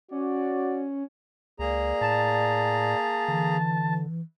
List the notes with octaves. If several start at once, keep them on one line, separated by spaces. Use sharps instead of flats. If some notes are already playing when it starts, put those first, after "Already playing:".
C#4 F#4 D5
C#2 A#3 G#4 D5 A#5
A2 A5
D3 E3